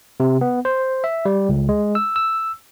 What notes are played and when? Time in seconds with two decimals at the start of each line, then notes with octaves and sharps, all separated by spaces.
0.20 C3
0.41 B3
0.65 C5
1.04 E5
1.25 G3
1.49 C#2
1.69 G#3
1.95 E6
2.16 E6